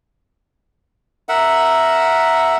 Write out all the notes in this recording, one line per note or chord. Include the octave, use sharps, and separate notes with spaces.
A#4 E5 F#5